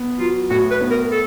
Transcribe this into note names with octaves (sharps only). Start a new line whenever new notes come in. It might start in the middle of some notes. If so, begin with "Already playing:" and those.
Already playing: B3
F#3 F4
A2 F#4
B4
B3
A#4
A4